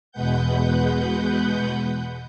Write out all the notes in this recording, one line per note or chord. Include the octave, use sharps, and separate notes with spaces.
E2 B2 G#3 B4 F#5 G6